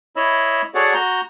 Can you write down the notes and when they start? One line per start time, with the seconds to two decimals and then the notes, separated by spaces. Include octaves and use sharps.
0.16 E4 C#5 D#5 B5 E6
0.75 F#4 G#4 A4 C#5 D5 F#5
0.94 F#4 A#5 G6